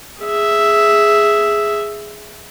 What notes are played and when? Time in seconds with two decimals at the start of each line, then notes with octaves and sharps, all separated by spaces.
0.22 G#4 E5